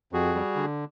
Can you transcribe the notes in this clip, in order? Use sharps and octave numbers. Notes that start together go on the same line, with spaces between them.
F2 F#4 G#4
G3
D3